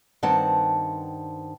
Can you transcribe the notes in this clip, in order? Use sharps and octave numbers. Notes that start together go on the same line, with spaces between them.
G2 D#3 C4 F#5 A5